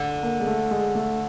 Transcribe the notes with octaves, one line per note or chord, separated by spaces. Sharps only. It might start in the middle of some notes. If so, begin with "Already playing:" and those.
Already playing: D3
A#3
G#3
A3
G#3
A3